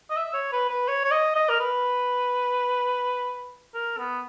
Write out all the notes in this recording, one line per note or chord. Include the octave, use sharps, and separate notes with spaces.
D#5
E5
C#5
B4
B4
C#5
C#5
D#5
D#5
A#4
B4
A#4
B3